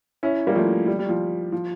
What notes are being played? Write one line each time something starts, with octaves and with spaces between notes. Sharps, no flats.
C#4 E4
G3 A#3
F3 A3
G3
G3
F3
F3